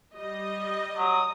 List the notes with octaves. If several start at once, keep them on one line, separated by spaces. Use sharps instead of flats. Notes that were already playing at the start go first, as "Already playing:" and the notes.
G3 D#5
F#3 D#6